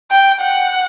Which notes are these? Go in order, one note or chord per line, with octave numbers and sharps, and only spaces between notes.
G5
F#5